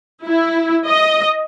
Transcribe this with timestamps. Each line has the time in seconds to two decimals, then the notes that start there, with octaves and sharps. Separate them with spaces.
0.25 E4
0.87 D#5